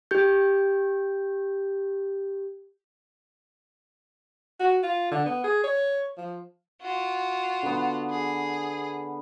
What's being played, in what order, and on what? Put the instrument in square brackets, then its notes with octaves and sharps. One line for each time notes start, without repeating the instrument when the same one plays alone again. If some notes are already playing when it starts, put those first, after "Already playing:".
[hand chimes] G4 G6
[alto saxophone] F#4
F4
D3
B3
G#4
C#5
F3
[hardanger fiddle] F4 F#4
[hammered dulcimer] D3 B3
[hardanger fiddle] G#4